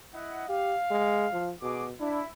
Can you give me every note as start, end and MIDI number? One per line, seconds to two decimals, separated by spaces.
0.13 0.49 64
0.13 0.49 75
0.13 0.49 78
0.49 0.76 67
0.49 1.48 77
0.91 1.27 56
1.33 1.53 53
1.62 1.93 47
1.62 1.85 66
1.62 1.85 68
1.62 1.85 86
2.00 2.20 62
2.00 2.29 64